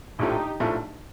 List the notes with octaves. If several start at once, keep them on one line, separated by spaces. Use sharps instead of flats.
A#1 A2 F3 A3 D#4 G4
A#1 A2 F3 A3